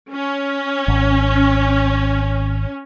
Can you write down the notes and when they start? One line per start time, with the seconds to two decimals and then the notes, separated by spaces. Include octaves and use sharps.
0.11 C#4
0.88 G#1